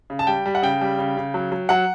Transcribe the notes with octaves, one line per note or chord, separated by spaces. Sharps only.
C#3
A5
G3 G5
G3
F#5
C#3 G5
G3
C#3
C#3
F#3
F#3
F#3 F#5